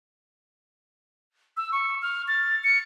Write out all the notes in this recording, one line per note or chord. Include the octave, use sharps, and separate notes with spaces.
E6
C#6
F6
A6
C#7